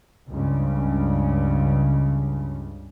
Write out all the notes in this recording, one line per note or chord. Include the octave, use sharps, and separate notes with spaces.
C#2 G2 C#3